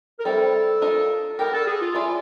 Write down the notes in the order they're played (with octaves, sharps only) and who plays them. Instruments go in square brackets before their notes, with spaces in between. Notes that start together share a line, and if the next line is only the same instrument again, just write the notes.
[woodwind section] A#4
[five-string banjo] G3 C4 E4 [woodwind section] A4
[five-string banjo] D4 F4 A#4 D#5
[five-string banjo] B3 D4 G4 [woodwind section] A#4
[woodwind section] A4
G#4
F4
[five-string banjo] C#4 E4 A4 D5 [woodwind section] F4